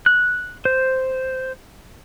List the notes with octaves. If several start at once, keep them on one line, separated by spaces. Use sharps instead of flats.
F#6
C5